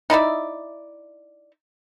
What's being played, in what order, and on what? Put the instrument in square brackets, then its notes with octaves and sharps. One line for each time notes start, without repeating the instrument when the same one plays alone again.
[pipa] D#4 E4 D5 E5